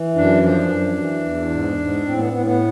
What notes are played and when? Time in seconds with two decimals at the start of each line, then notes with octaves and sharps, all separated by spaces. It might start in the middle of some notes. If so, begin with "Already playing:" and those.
Already playing: E3
0.15 F#2 D4
0.43 F3 D4
0.69 F#2
0.97 E3
1.24 E2
1.51 G#2
1.78 G#2
2.05 A2 C4
2.19 B3
2.32 A2 B3
2.46 B3